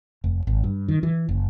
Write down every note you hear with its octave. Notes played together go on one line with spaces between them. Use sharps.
F1
G#1
G2
D#3
E3
F#1